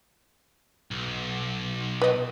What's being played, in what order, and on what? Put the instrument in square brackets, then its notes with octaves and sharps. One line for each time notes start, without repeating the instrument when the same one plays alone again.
[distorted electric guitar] B1
[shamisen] B4 D#5